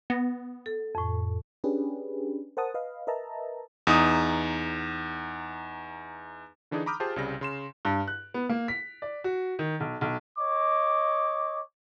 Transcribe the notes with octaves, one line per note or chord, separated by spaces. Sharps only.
B3 A#6
A4
F2 A2
C#4 D4 G4 G#4 B4
A#4 C5 F#5 A5 D#6
B4 D#5 F5
A#4 B4 D#5 E5 A5 A#5
E2 D#4 D#6
D3 E3 D4 D#4 G#4
A#5 B5 D6 D#6 F6 G6
F4 G4 G#4 C5 A5
C2 C#3 G3 C4 A#6
C#3 C6 E7
G2
F#6
B3
A#3
B6
D5
F#4
D#3
B1
B1
C#5 D#5 D6